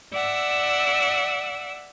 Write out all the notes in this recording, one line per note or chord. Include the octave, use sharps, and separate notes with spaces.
D5 E5 F#5 E6